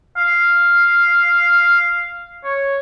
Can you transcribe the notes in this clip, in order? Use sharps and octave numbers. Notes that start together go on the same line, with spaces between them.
F5
C#5